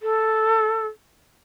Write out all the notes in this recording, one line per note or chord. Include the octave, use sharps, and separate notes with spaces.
A4